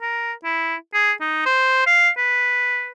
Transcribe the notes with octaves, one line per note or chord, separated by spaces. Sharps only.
A#4
E4
G#4
D#4
C5
F5
B4